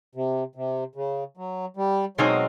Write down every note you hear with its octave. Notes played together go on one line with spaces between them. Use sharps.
C3
C3
C#3
F#3
G3
B2 F#3 G#3 C4 D#4